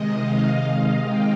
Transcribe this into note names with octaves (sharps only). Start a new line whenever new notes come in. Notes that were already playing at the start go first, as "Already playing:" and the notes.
Already playing: C3 D#3 G#3 D#5
F5
F5
G5